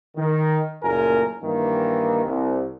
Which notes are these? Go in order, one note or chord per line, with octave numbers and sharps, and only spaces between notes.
D#3
F#1 A#2 A3 A#4 G#5
G2 D#3 E3 A#3
C2